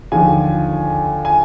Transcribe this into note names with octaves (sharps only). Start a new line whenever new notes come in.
D#2 D3 F3 G#5
G#5